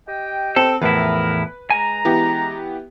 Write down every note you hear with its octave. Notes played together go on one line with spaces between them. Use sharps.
G4 D#5 G5
C4 A4
E2 A2 F3 E4 A#4 B4
G#3 G#5 A#5
E3 B3 G4